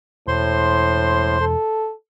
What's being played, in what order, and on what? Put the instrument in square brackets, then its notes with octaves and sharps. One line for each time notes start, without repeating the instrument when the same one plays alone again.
[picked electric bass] E1 [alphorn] A2 [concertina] C5 C6
[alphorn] A4